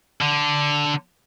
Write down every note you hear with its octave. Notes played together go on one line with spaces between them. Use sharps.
D3